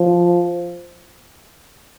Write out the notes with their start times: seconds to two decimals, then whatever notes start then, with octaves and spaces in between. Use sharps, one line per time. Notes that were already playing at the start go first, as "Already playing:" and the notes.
Already playing: F3